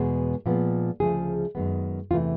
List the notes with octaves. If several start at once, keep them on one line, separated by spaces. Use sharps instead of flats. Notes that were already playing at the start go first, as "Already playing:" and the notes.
Already playing: E2 B2 G#3 B3
A#2 F3 G#3 B3
D2 C#3 F3 A3 G#4
F#2 D#3 G#3 B3
E2 C3 E3 A3 F4